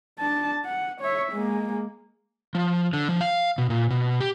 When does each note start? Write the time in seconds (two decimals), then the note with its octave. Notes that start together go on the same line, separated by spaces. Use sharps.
0.19 D4 A5
0.65 F#5
1.01 C#5 E5
1.33 G#3 A#3
2.55 F3
2.93 D3
3.09 F3
3.21 F5
3.58 B2
3.70 A#2
3.90 B2
4.20 G4